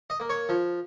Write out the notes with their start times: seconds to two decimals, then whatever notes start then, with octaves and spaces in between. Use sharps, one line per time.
0.10 D#5
0.20 A#3
0.30 C#5
0.49 F3